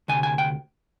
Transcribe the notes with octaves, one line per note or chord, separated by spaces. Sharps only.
D2 C3 G#5
G#5
G5